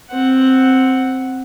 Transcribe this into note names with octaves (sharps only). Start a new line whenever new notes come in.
C4 F#5